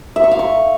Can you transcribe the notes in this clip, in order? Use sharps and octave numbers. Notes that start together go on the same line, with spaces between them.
E5
C#6
F5
C#6